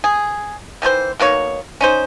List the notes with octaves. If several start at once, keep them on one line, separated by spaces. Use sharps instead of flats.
G#4
D#3 E3 G#4 C5
B2 A#3 D#4 C#5
C#4 D#4 C5